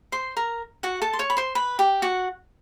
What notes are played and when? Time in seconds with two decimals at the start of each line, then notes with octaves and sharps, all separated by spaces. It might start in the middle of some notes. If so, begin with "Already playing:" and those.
0.12 C5 C6
0.37 A#4 A#5
0.83 F#4 F#5
1.02 A4 A5
1.13 C6
1.19 C#5 C#6
1.30 B5
1.37 C5 C6
1.55 B4 B5
1.79 G4 G5
2.02 F#4 F#5